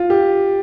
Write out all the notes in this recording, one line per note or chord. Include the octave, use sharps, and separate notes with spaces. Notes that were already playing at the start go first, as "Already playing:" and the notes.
Already playing: F4
G4